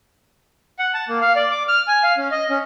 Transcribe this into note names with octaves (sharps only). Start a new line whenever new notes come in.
F#5
A5
A#3
F5
D5
D6
F6
G#5
F5
C#4
D#5
C#4